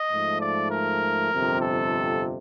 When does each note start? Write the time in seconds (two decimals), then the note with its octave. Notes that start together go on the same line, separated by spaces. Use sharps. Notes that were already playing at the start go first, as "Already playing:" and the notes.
Already playing: D#5
0.10 G#2 F3 A3
0.40 D5
0.70 A#4
1.31 G1 F2 C3 F3
1.61 A4